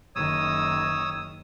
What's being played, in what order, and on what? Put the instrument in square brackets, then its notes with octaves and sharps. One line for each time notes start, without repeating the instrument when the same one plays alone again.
[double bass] F#1 D#3 [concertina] C#5 D#6 E6